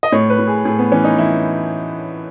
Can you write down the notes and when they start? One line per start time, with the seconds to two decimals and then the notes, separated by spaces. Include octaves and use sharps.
0.03 D#5
0.12 A2 C#5
0.30 B4
0.39 A2
0.48 G#4
0.65 A2 G#4
0.79 B3
0.91 E3 C#4
1.05 D#4
1.18 E3 E4